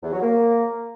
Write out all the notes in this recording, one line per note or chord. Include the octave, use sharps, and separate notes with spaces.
E2
F#3
A#3